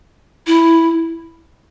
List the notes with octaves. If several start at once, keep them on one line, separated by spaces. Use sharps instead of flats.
E4